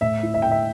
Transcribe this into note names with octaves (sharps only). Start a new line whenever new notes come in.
A2 E5
E4
E5
A2 G5
E5